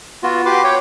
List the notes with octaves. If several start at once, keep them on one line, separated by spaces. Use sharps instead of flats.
B3 F4 F#4
G4 B4 C6 D6
C#5 G5